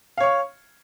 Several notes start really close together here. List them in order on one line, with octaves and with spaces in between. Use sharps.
F5 C#5 C#6